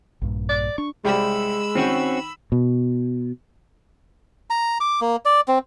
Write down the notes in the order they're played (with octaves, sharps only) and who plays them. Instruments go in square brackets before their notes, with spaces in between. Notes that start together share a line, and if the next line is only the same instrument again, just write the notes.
[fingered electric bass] A#1 G2 A#2
[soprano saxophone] D5
[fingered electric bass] D4 [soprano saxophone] C#6
[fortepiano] C2 G4 D5 [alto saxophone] G#3 [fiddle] B5 E6
[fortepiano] D#3 G5 [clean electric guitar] C4 C#4 F#4
[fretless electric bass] B2
[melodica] A#5
D6
A#3
D5
C4